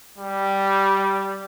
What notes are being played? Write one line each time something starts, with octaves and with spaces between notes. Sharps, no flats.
G3